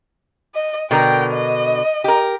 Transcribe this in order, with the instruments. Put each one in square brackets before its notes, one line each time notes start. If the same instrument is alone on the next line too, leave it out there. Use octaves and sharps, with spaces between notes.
[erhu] D#5
[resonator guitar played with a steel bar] B2 D3 A#4 [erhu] G5
[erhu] D#5
[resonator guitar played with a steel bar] G4 A#4